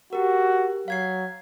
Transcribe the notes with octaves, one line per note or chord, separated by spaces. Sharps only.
F#4 G4 A#4
F#3 F5 G#6 C7